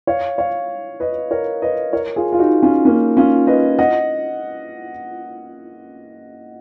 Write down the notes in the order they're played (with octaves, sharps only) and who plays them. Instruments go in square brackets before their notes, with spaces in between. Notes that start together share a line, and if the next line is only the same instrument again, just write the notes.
[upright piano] C#5 F5
C#5 F5
B4 D#5
A#4 C#5
B4 D#5
A#4 C#5
F4 G#4
F4
D#4 F#4
C#4 F4
A#3 C#4
C#4 F4
B4 D#5
D#5 F#5